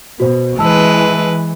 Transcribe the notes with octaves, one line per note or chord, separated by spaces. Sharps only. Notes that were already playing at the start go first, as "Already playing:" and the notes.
B2 F#4 C5
E3 G#3 B4 A5 E6